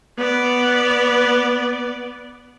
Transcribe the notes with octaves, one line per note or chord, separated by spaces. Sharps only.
B3 D5